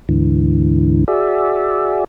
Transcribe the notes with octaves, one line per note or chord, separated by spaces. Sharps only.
D2 G#2 D3 E3
F#4 G#4 D5 E5